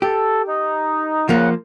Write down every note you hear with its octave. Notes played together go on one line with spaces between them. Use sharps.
G4 A4
D#4
C#3 F3 A#3 F#5